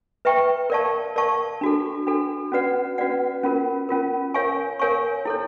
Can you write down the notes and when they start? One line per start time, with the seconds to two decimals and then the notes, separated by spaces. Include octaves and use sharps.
0.25 B4 E5 G5 A#5 C#6
0.70 A#4 D5 F5 A5 C#6
1.16 A#4 D5 F5 A5 C#6
1.61 D4 F#4 A4
2.07 D4 F#4 A4
2.52 C#4 F#4 B4 D5 F#5
2.98 C#4 F#4 B4 D5 F#5
3.44 C#4 F4 A#4
3.89 C#4 F4 A#4
4.34 A#4 C#5 F5 G#5 C#6
4.79 A#4 C#5 F5 G#5 C#6
5.25 E4 A4 C#5